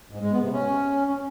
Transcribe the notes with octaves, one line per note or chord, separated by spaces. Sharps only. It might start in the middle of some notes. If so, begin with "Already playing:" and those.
G#2
G#3
B3
C3
C#4